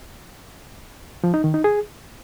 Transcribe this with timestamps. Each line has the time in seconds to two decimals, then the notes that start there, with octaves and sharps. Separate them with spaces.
1.24 F3
1.34 D#4
1.44 D#3
1.54 D#4
1.64 G#4